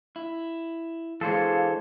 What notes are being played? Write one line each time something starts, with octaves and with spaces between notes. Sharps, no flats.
E4
E3 G#3 A4 C5 C#5 F5